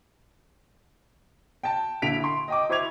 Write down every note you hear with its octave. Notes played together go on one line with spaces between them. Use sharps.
G5 A5
A#1 D3 E4 B6 D7 F7
C6
D#5 G5 D6
E4 C5 C#6 D6 G#6 F7